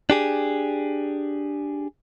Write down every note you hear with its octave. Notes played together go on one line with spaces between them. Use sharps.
D4 G4 G#4